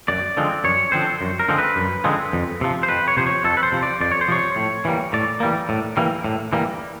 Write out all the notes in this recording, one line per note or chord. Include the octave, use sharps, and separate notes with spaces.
F#2 D5
D3 F3 G#3 C4
F#2 C#5
D3 F3 G#3 C4 C5
F#2
A#4
D3 F3 G#3 C4
B4
F#2
D3 F3 G#3 C4
F2
C3 F3
C5
F2 B4
C#5
C3 F3 C5
C#5
F2 A4
B4
C5
C3 F3
D5
F2 D5
C#5
C5
C3 F3 C#5
A2
E3 G3 A#3
A2 D5
E3 G3 A#3
A2
E3 G3 A#3
A2
E3 G3 A#3